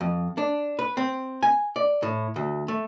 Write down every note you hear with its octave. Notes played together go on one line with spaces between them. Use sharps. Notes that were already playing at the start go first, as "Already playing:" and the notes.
F2
D4
B4
C4
G#5
D5
A2
D2
A3